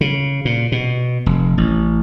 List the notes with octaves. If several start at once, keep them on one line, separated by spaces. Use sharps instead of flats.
C#3
A#2
B2
F1
A1